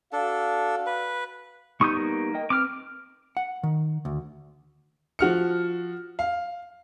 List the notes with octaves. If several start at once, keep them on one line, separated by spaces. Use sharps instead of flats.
D4 F#4 A4 F5
B4
G3 B3 D#4 C#6 D#6 G6
A#3
A#4 D#5 G5
C4 B4 D6 F6
F#5
D#3
D2
F3 F#4 F6 C#7
F5